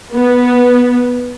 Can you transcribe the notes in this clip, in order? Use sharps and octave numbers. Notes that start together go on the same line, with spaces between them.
B3